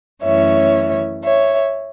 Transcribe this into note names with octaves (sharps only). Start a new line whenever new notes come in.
F#2 E3 A3 C#4 C#5 E5
C#5 E5